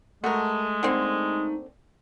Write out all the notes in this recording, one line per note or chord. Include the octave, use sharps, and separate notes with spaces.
G#3 A3 F#4 A#4 A5
D3 A#3 C4 D#4